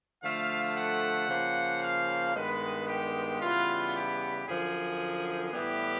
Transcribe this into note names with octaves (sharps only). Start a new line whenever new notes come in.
D3 F3 A3 F5
F#5
C#3 F3 A#3
F5
G2 D#3 G#3 B3 B4
G4
C#3 E3 G3 B3 F4
G4
F#2 D3 F3 G#4
A2 E3 G3 B3 G4